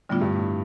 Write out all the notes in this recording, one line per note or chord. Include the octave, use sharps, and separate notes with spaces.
A2 D3 G3 B3 D4 F4
G2
A2